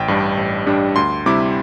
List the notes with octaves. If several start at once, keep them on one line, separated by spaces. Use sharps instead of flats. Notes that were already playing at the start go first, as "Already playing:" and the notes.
Already playing: A1 G5
G2 G3 D4
A1
G2 G3 D4
D2 C6
C3 G3 E4 D6